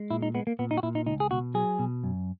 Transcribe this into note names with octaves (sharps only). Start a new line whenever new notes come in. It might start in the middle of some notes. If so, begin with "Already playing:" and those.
Already playing: G#3
A#2 E4
D#4
G#3 B3
A#3
A#2 B3
D#4
F#4
A#2 E4
D#4
C#2 D#4
G#4
B2 F#4
F#3 G#4
B2
F#2